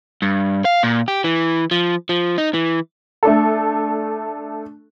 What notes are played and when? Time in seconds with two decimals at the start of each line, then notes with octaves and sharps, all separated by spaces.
0.22 G2
0.65 F5
0.83 A#2
1.08 G4
1.24 E3
1.71 F3
2.09 F3
2.38 D#4
2.54 E3
3.23 A3 D4 A4